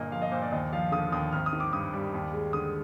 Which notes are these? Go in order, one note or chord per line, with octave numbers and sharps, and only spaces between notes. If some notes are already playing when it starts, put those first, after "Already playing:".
Already playing: G1 A#2 A#3 D#5
F3 F5
D#5
A#2 C5
D5
D#2 D#5
F3 F5
D3 D#6
D#2 D#6
G#1 F6
D#6
D#3
D6
G2 D#6
G3
D#2
G#3
D3 D#6